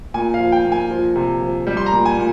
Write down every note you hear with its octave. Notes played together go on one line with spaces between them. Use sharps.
A#2 G#5
F5
F3
G5
A#2
G#5
F3
C3
F3
G3
C6
A#5
A#2
G#5
A#2